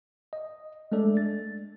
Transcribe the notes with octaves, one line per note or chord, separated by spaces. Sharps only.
D#5
G#3 A3 D4 A4 D5
A6